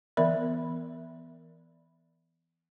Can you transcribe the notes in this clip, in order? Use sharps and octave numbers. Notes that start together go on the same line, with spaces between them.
E3 B3 A#4 D5 E5 B5